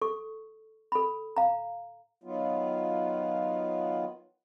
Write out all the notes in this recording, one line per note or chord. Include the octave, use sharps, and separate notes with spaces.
A4 C#6
A4 B5
F5 A#5
D#3 F#3 B3 F4